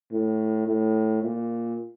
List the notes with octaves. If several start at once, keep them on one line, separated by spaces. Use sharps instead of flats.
A2
A2
A#2